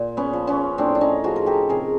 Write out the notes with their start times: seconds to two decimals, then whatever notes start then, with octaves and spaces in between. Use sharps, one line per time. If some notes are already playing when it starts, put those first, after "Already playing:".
Already playing: A#2
0.17 B3 C#4
0.33 F3
0.47 B3 C#4
0.78 A2 C4 D4
0.95 D4
1.01 C#4 D#4
1.24 F3 F#4 G#4
1.36 A#4
1.46 G4 A4
1.69 C3 G#4 A#4